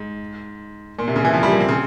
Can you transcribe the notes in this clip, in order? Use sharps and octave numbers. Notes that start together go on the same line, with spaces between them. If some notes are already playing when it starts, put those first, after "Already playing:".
Already playing: G#2
A#2
C3
C#3
E3
F3
G3
A#3
C4
C#3